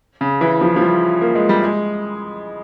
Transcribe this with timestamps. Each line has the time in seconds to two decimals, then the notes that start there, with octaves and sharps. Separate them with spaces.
0.21 C#3
0.41 E3
0.61 F3
0.76 F3
0.81 G3
1.21 A#3
1.35 G#3
1.49 G3
1.64 G#3